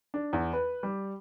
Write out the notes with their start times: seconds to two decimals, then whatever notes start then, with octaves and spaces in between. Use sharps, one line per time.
0.14 D4
0.33 E2
0.53 B4
0.83 G3